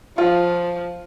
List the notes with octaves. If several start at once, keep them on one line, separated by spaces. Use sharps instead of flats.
F3 F4